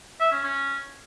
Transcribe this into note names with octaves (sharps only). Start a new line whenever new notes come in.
E5
C#4
C#4